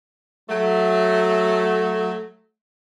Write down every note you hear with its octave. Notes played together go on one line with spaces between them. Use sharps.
F#3 A3